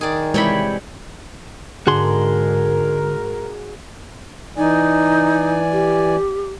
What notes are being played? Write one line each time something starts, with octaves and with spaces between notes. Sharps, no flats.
D#3 G#4 D5
C3 E3 G3 G#3 E4 C#5 G5 B5
G#2 D3 F#4 G#4 A#4 C6
E3 D#4 D5 G#5
G4